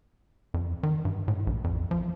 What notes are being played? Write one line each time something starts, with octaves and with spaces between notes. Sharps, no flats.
F2
D#3
G2
A2
A#1
F2
F3